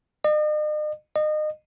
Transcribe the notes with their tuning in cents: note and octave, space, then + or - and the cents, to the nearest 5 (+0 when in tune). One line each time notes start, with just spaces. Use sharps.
D#5 -45
D#5 -30